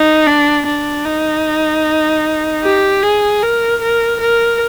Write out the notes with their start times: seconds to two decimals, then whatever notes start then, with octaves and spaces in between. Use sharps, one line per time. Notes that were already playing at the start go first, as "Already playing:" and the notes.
Already playing: D#4
0.27 D4
0.66 D4
1.05 D#4
2.64 G4
3.03 G#4
3.43 A#4
3.82 A#4
4.21 A#4